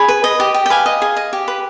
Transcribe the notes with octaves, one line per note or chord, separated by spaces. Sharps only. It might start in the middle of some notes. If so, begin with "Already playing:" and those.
Already playing: G#4 B5
B4
D#5
G4
G4
G5
B4 F5 G#5
D#5
G#4
D#5
G4
B4